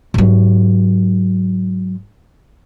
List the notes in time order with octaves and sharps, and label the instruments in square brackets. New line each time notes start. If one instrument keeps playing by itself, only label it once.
[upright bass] G#2 F#3